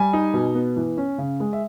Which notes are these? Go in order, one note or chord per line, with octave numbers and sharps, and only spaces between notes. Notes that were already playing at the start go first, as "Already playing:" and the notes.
Already playing: G3 G#5
D#4
B2
B3
E3
C#4
C#3
G#3
E5